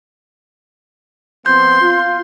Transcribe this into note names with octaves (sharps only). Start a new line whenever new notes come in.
F3 B3 C4 C6 G6
F4